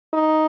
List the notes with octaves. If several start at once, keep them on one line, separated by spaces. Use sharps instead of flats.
D#4